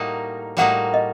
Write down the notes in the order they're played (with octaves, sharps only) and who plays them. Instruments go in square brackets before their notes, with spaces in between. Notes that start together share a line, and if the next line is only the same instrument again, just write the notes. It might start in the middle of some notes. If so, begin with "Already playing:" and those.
Already playing: [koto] A2 G3 A#3 D#4 F#4
[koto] A2 G3 A#3 D#4 F#4 [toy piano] F#5
[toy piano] D#5